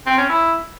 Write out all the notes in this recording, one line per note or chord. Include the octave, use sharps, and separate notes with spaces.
C4
C#4
E4